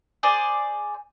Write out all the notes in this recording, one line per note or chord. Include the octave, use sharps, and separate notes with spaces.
G#4 C5 D5